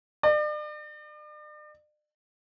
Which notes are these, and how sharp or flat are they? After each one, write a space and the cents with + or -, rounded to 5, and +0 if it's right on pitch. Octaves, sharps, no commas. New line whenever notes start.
D5 +40